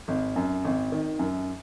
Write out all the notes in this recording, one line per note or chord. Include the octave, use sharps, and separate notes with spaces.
G#1
F#2
G#1
D#3
F#2